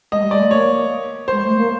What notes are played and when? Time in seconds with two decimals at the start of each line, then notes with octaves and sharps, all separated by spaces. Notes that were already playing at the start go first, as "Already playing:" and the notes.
0.12 G#3 D#5
0.22 G3
0.31 G#3 D5
0.41 A3
0.50 A#3 C#5
1.28 G#3 C5
1.43 A3
1.55 A#3